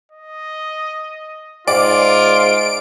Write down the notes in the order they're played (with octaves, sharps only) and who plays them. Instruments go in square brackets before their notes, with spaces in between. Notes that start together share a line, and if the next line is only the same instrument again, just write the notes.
[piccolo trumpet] D#5
[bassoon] G#2 [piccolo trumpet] F4 [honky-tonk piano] D5 [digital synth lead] D7